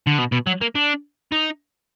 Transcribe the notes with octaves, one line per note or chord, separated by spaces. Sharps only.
D3
B2
B2
F#3
A#3
D4
D#4